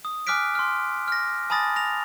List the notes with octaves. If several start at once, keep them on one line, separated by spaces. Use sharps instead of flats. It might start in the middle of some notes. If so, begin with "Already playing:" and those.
D#6
G#5 D6 F6 F#6 B6 D7
C6 F6
F6 A#6
G#5 A5 B5 D#6 A6 A#6
A#6 F7